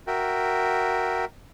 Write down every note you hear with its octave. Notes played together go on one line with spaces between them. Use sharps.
F#4 A#4 E5 G5